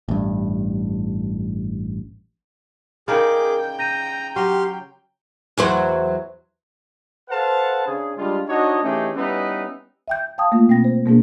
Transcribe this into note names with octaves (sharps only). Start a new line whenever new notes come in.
A1 G2
C#3 D#4 G#4 A#4 D5 G5 D6 F6
A#5 G6 A#6 D#7
F#3 G4 C6 F6
E2 F#3 C5
A4 B4 C5 F5 F#5 A5
C#3 C#4 D4 G#4
G3 G#3 D4 F4
D4 D#4 F#4 C#5 D#5
E3 A3 C#4 D#4 G4 G#4
G3 B3 C#4 D#4 E4 B4
E5 G5 G6
F5 G5 A5 D#6
A3 A#3 F4
B2 C4 G5 A#6
C5
B2 G#3 A#3 B3 D4 G#4